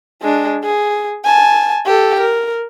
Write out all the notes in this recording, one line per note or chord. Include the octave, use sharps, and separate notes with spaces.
G#3 D4
G#4
G#5 A5
G4 A4
A#4